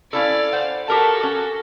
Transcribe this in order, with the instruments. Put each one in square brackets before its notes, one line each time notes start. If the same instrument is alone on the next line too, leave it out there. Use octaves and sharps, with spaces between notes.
[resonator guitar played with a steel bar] C#4 E4 A4 [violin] D5 F5
[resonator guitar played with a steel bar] C5 F#5
[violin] F#4 A4 [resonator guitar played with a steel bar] G4 A#4 A5
[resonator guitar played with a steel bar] C#4